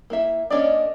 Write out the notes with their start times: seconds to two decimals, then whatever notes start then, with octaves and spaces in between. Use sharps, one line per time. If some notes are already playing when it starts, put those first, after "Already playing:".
0.10 A#3 E4 E5
0.50 A#3 C#4 D4 D5 D#5